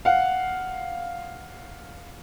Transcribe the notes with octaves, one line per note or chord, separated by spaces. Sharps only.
F5 F#5